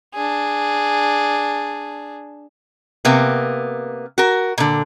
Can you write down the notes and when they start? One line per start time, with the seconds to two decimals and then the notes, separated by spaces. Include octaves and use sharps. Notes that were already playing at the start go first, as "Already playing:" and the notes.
0.14 D4 G#4
3.05 C3 A#3 B3
4.18 F#4 A#4
4.58 A#2 D3